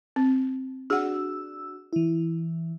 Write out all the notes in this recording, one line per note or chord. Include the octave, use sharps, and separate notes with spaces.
C4
D4 F#4 G#4 F#5 E6
E3 E4